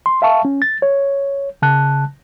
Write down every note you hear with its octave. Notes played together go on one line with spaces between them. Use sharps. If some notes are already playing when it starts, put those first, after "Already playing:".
C6
E5 F5 A5 C#6
C#4
A6
C#5
C#3 A5 F#6